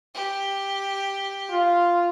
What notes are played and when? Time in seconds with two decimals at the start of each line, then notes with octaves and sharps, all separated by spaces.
0.15 G4
1.51 F4